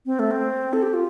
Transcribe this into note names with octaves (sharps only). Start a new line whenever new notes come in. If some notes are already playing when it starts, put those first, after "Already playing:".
C4
A3
C4
A4
G4
F4